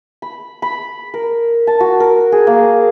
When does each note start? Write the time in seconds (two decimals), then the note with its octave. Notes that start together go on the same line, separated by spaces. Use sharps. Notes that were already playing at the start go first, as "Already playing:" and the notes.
0.22 B5
0.62 B5
1.14 A#4
1.67 A5
1.80 F#4
2.00 A#4
2.32 G#4
2.47 A#3